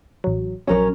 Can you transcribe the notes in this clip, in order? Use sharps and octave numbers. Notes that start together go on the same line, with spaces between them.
A1 F#3
A#1 F#3 C#4 A#4 C#5